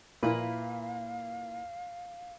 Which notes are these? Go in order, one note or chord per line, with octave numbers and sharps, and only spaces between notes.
A#2 A#3 E4 B4 F5